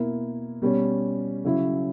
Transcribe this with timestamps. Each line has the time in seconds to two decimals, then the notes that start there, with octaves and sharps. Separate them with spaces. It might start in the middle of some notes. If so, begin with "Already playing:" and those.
Already playing: B2 A#3 E4
0.62 B2 G3 C#4
1.45 C#3 F#3 C#4 E4